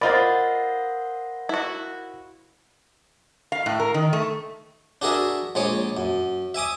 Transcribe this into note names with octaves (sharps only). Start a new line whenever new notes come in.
F4 A#4 C5 D5 D#5 F5 F#5 B5
E4 F#4
F5
A2
A#4
D#3
A3
D4 F#4 G#4 A#4 E5
A#1 G#3 C#5 D6
F#2
E5 G#5 D6 D#6